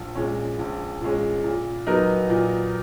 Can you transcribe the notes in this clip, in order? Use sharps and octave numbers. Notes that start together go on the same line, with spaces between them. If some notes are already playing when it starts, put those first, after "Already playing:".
Already playing: A#1
A#2 G#3 C#4
A#1
A#2 G#3 C#4
A#2
F#3 B3 D#4 A#4
A#2